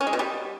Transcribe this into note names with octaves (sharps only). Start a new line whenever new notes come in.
C#4
G#3
B2
G3